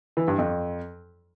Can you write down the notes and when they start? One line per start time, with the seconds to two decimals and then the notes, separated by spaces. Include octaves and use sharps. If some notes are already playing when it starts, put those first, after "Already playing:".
0.17 E3
0.28 G2
0.38 F2